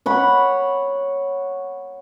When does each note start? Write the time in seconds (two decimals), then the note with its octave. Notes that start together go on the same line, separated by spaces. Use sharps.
0.06 C#5 F#5 B5